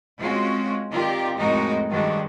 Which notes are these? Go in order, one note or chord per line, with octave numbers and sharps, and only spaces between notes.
G#3 C4 C#4 F4 F#4
D#3 C4 F4 G4 A#4 D5
F2 A2 G#3 D#4 F#4 A#4
G2 D#3 F3 G#3 D4 F#4